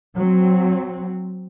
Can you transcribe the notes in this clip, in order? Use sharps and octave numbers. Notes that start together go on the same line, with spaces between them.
F#3 C4